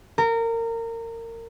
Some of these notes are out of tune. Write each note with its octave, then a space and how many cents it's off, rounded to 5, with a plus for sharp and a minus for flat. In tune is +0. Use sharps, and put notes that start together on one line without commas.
A#4 -25